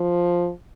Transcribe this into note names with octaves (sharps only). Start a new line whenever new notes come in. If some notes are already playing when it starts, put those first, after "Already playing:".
Already playing: F3